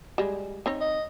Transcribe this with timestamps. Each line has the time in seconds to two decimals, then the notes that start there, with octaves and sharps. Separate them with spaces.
0.18 G3 G#3
0.66 C4 D#4 C#5
0.80 D#5